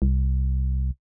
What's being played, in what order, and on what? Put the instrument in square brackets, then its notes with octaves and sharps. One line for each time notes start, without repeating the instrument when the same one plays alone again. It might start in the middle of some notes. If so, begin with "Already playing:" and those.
[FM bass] C2